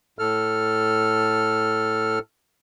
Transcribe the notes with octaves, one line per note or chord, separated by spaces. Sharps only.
A2 A4 F6